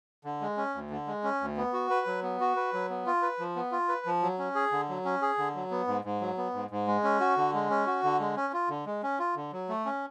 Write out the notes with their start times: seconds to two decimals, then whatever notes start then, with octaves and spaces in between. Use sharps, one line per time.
0.25 D3
0.41 G#3
0.57 C#4
0.75 D2
0.90 D3
1.07 G#3
1.24 C#4
1.41 D2
1.57 B3
1.73 F#4
1.90 B4
2.07 F#3
2.23 B3
2.40 F#4
2.56 B4
2.73 F#3
2.90 B3
3.06 F4
3.22 B4
3.39 F3
3.56 B3
3.72 F4
3.89 B4
4.06 F3
4.22 F#3
4.39 C#4
4.55 G#4
4.72 D3
4.89 F#3
5.05 C#4
5.22 G#4
5.38 D3
5.55 F#3
5.71 B3
5.87 G#2
6.05 G#2
6.21 F#3
6.37 B3
6.54 G#2
6.70 G#2
6.87 G#3
7.04 C#4
7.20 F#4
7.37 D3
7.54 G#3
7.70 C#4
7.87 F#4
8.03 D3
8.19 G#3
8.37 C#4
8.53 F4
8.69 D3
8.86 G#3
9.03 C#4
9.19 F4
9.36 D3
9.52 F#3
9.69 A3
9.85 C#4